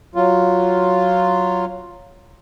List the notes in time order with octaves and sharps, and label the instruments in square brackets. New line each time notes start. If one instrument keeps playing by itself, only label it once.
[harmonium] F#3 F4